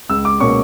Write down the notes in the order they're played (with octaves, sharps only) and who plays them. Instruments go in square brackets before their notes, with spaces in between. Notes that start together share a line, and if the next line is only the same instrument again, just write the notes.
[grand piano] C#2 E6
D6
B2 A#3 C#4 C#6